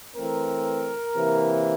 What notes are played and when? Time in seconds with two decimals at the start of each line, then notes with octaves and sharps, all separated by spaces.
0.17 E3 A3 C4 A#4
1.15 C3 E3 A#3